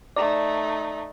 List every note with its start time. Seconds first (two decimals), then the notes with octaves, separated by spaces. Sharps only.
0.16 A3 D#4 D5